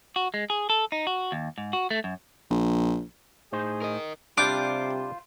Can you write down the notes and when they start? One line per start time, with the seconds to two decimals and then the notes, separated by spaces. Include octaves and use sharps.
0.16 F#4
0.34 G#3
0.50 G#4
0.70 A4
0.92 D#4
1.07 F#4
1.32 D#2
1.58 G#2
1.73 F#4
1.91 A3
2.04 F#2
2.50 A#1
3.52 A2 D#4 G#4 C5
3.82 A#4 D#5
4.38 C3 G3 D4 F4 C5 D6